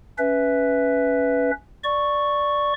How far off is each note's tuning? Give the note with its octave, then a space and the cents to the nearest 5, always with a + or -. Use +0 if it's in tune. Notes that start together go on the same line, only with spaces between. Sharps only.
C#4 +15 B4 +0 E5 +0
D5 +0 C#6 +0